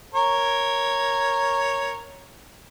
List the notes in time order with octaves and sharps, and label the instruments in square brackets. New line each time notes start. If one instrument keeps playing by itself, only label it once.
[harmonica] A#4 C#5